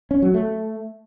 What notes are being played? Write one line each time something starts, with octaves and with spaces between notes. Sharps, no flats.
C#4
F#3
A3